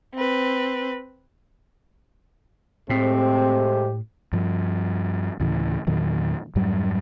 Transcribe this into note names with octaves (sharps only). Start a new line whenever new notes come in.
C4 B4
A2 G#3 A3 C4 G4 C5
G2 F3
D2 A2 C#3 E3
E2 A#2 D#3 F#3
F2 G#2 F#3 G3